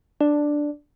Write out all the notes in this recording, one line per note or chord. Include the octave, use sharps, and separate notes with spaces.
D4